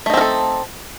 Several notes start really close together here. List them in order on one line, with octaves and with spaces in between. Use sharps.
A3 D#4 C4 A#4 A4